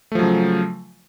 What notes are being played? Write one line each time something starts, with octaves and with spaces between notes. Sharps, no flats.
C#3 F3 F#3 A3